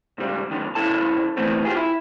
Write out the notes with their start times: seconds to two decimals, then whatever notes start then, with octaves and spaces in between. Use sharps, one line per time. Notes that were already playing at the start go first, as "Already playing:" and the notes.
0.18 G#2 C#3 G3
0.51 F#2 A#2 D3 D#3
0.75 C2 C#3 C#4 E4 A4 A5
1.37 E3 A3 B3 C4
1.64 F4 G4 G#4
1.76 E4